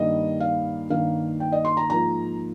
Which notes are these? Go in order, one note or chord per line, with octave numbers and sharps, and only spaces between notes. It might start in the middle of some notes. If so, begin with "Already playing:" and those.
Already playing: G2 D#3 G3 A#3 D#5
F5
G2 D#3 A#3 F5
G5
D#5
C6
A#5
G#2 F3 A#3 A#5